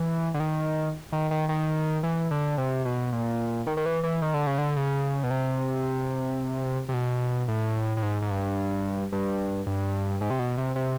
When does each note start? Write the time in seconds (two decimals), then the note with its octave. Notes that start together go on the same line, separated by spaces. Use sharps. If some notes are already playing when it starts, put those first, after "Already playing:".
Already playing: E3
0.34 D3
0.40 D#3
1.12 D#3
1.31 D#3
1.49 D#3
2.03 E3
2.31 D3
2.58 C3
2.85 B2
3.12 A#2
3.67 D#3
3.77 D#3
3.86 E3
4.03 E3
4.22 D#3
4.34 D3
4.47 C#3
4.58 D3
4.76 C#3
5.23 B2
5.31 C3
6.89 C3
6.94 B2
7.48 A2
7.97 A2
8.03 G#2
8.22 G#2
8.30 G2
9.12 G2
9.67 G2
10.21 G#2
10.30 C3
10.39 B2
10.58 C3
10.76 C3